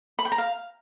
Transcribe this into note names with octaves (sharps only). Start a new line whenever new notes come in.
B5
G5
A#5
F5